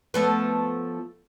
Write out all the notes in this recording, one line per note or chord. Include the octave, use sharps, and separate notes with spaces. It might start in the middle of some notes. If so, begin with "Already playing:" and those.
F3 A3 B3